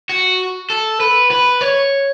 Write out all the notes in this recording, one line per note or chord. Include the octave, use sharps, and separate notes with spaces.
F#4
A4
B4
B4
C#5